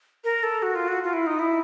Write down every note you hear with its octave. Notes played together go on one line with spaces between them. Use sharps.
A#4
A4
F#4
F4
F#4
F4
E4
D#4
E4